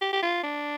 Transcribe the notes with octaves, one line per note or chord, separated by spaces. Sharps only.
G4
G4
F4
D4